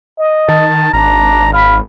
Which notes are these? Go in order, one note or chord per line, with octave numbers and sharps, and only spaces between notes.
D#5
D#3 A5
G#1 D4 A#5
F5 B5